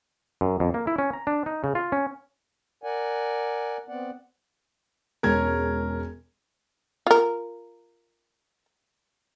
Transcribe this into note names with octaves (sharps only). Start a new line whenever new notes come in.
F#2
F2
A#3
E4
C#4
A#5
D4
D#4
C#3
F4
C#4
A#4 D5 F#5 G#5
B3 C4 D5 F#5
E1 G#3 C#4 A#4 G#6
F4 A#4